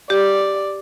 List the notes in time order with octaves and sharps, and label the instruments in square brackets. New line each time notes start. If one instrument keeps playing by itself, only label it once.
[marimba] G4 [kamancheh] D5